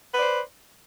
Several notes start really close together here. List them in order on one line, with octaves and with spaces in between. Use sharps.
B4 D5 C5